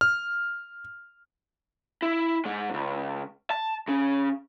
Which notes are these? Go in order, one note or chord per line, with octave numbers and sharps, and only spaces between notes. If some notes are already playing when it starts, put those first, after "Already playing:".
F6
E4
G#2 G#3
C#2 G#2
A5
C#3 C#4